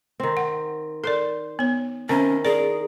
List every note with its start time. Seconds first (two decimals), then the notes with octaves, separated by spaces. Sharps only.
0.20 D#3 C4
0.37 F#5
1.04 A4 A#4 C5 D5
1.59 B3 C#5
2.09 D#3 C4 C#4 E4 C5
2.45 G#4 A#4 D5